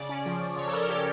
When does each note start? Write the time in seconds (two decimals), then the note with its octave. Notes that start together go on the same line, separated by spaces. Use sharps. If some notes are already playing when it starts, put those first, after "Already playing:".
Already playing: C#3 D5
0.09 C#4
0.26 F3
0.41 F3
0.57 C#3 C#5
0.67 A4
0.73 C#4 A#4
0.89 C#4 G4